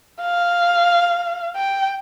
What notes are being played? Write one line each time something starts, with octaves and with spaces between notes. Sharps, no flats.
F5
G5